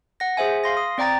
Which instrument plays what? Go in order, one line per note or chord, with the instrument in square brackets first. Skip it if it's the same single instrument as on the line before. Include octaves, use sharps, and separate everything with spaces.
[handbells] F#5 A#6
G#4 C5 E5 G#5
F5 C6 A#6
D#6
C4 D5 G5 A#5 A6 D7